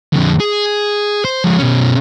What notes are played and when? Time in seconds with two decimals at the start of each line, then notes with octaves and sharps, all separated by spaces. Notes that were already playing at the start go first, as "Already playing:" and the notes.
0.13 F2 D3
0.40 G#4
1.25 C5
1.44 F3 G#3
1.59 B2 C#4